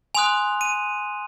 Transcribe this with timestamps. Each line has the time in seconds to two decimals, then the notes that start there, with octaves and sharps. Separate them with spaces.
0.15 G#5 C6 D#6 F#6 F7
0.61 D#7